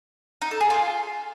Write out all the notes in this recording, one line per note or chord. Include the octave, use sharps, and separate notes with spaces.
D#4
A4
G#4
F4